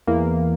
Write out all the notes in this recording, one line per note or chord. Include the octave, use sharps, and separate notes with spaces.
E2 E3 A#3